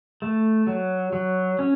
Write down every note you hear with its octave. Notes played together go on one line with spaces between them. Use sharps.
A3
F#3
F#3
C#4